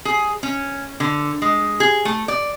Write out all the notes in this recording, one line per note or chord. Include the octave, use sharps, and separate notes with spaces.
G#4
C#4
D3
G#3
G#4
A3
D5